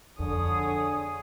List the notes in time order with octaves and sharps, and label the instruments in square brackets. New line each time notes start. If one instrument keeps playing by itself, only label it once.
[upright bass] F2 [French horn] D3 [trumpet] G#4 [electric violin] C#5 D#6